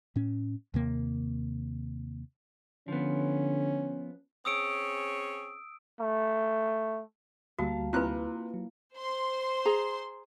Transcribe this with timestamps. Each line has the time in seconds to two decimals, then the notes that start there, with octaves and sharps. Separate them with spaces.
0.16 A2 C#4
0.74 D#2 C3 A#3
2.88 D3 F3 B3 C#4
4.45 C4 C#4 G#4 D#6 E6 D7
6.00 A3
7.59 D2 G3 A#3 F#4 F5 A5
7.93 C3 A#3 E4 F4 B4 F#6
8.54 F#3
8.97 C5 C6
9.65 G#4 A#5